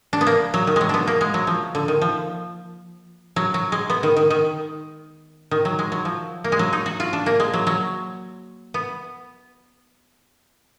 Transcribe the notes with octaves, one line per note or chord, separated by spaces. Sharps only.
D4
B3
A#3
F#3
D#3
F#3 G#3
B3 D4
A#3
G#3
F#3
F3
D3
D#3
F3
F#3
F#3
G#3
B3
D#3
D#3
D#3
D#3
F#3
G#3
F#3
F3
A#3
G#3
F#3
D#4
F#4
F4
D4
A#3
G#3
F#3
F#3
B3